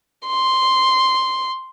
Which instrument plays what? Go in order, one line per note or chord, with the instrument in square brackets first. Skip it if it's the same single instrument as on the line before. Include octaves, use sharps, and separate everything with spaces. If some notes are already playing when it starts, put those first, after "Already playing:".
[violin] C6